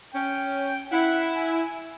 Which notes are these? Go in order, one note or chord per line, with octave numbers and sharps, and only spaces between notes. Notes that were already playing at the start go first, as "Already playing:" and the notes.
C#4 G5
E4 F#5
G#5